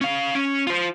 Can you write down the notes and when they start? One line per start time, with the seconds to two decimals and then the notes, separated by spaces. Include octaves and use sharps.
0.01 C#4 F5
0.35 C#4
0.67 F4 C5